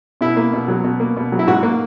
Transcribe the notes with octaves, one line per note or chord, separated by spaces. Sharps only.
B2 E4
A#3
B2
F#3
B2
A#3
B2
F#3
E4
G#2 F#4
A#3